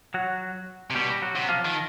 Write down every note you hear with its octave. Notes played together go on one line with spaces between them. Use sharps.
F#3 F#4
C3
B2 G3 G4
F#3 F#4
C3
F3 F4
D#3